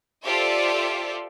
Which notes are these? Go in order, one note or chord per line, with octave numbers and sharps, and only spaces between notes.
F4 G4 A4 C5 D5 E5